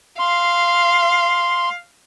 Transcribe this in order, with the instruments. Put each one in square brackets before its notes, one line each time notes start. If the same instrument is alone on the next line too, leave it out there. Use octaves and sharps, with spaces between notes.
[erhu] F5 [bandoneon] C6